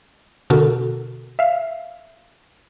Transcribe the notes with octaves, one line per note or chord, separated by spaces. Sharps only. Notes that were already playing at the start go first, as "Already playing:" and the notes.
B2 D3 F#4 A4 A#4
E5 F5